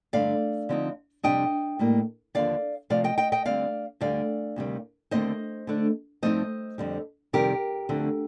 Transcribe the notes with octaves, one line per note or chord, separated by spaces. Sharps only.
G2 D3 A3 D5 F5
D3 F3 C4 D#4
F2 C3 G3 D4 D#5 G5
A2 G3 A#3
D#2 D3 F3 D5 F5
C3 F3 A3 D5 F5
D#5 G5
D#5 G5
D#5 G5
D2 D3 G3 C4 D5 F5
D2 D3 G3 D5 F5
D2 C3 D#3 G3
D#2 D3 A3 C4 C5 D#5
D3 A3 D4
G2 F3 A3 C4 D#4 C5 D#5
F2 D3 G3
F2 C3 D#3 G3 C4 G4 A#4
D2 D3 F3 A3 C4